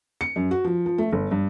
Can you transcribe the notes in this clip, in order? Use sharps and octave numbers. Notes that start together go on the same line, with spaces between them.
C#7
F#2
F#4
F3
F3
A3
G1
G2